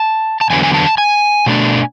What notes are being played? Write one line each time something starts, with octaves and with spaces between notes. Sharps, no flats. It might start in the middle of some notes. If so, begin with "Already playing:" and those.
Already playing: A5
A5
E2 D3 F#3 B3 G#5
G#5
A5
G#5
B2 A3 D4